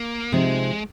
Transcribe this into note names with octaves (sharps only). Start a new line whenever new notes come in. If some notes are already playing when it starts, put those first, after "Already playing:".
Already playing: A#3
C3 F3 G#3 C4 D#4